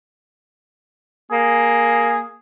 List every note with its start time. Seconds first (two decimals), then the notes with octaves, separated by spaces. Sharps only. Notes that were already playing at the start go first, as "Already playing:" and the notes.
1.31 A#3 G#4